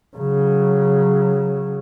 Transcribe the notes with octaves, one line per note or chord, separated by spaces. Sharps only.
C#3 F#3